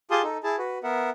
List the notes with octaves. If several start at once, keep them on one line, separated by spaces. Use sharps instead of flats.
F4 G4 G#4 A5 C6 D#6
D#4 A4
E4 G#4 A5
F#4 B4
B3 A#4 E5 F#5